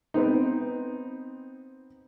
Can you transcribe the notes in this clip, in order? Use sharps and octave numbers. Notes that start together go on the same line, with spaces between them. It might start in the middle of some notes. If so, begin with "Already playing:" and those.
B3 C4 D#4